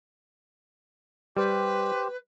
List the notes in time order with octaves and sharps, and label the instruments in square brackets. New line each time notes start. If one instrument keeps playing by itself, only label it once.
[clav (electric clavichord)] G3 [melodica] G4 C5 [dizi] B4